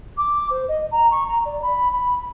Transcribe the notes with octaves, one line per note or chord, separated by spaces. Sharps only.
D6
C5
D#5
A#5
C#6
A#5
D5
B5
B5